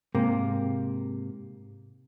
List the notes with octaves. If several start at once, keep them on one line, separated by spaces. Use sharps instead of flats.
G#2 C3 A#3